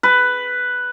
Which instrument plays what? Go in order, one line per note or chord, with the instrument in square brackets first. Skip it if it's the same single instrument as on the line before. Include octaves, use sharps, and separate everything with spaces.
[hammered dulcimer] B4